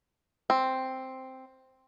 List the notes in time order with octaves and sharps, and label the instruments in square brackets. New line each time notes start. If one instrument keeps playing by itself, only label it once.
[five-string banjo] C4